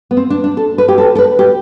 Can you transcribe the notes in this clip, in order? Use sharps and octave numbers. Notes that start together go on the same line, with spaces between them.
B3
C4
D4
D4
A4
B4
G4
A4
A4
B4
G4